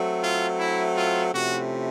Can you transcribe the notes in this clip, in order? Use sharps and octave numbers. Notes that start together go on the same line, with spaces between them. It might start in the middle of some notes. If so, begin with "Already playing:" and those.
Already playing: F#3 A3 C4
F4
E4
F4
C3 F3 A3 C#4 E4 F#4